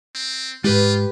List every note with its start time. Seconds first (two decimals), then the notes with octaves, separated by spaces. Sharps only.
0.15 C4
0.64 G#2 G#3 F4 G4 B4